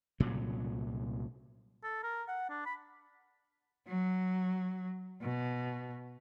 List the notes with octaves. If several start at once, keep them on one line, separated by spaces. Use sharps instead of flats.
C2 A#2 C#3 F#3
A4
A#4
F#5
D4
B5
F#3
B2